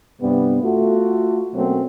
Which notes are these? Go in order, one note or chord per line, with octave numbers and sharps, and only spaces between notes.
G2 C3 G3 B3
A3 F4 F#4
B2 F#3 A3 A#3 C4 C#4